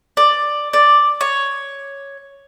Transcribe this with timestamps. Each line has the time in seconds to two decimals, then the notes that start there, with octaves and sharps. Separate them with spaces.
0.17 D5
0.73 D5
1.21 C#5